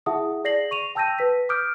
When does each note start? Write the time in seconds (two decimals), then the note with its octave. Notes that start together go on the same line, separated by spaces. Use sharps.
0.06 E4 G#4 E5 F#5 A5 D#6
0.44 G#4 D5 A#6 C7 F#7
0.71 C#6 D#7 F7
0.95 G5 A5 E6 G6 A#6 D#7
1.19 B4 B6
1.49 D6 D#6 F6 G6 D7